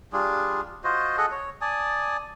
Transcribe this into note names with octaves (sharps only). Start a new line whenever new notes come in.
G3 D4 F4 G#4
F4 F#4 C5 D#5
G#4 A4 D#5 F#5
C#5
D5 G#5 A5 D#6